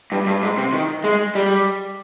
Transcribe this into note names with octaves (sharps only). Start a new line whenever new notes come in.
G2
G2
G#2
C3
D#3
G#3
G3